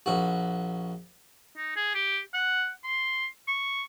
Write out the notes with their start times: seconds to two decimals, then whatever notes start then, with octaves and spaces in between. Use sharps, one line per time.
0.06 A#1 F#4
1.57 D#4
1.76 G#4
1.95 G4
2.34 F#5
2.84 C6
3.48 C#6